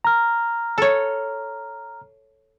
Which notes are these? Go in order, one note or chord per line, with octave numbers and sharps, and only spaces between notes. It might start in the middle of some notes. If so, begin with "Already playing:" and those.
A#5 F6
A4 C#5